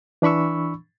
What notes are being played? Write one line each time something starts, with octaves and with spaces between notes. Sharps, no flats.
E3 D4 B5 C#6 E6